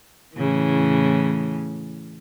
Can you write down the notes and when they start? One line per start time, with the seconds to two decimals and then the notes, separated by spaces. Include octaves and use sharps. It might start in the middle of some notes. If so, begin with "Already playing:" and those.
0.35 A2 C#3 E3